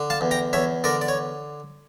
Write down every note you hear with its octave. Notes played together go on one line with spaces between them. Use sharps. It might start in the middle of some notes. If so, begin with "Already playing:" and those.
Already playing: D3
F5 A5
E2
G5 A#5
E2 C#5 E5
D3 A#4 D5
D5
C#5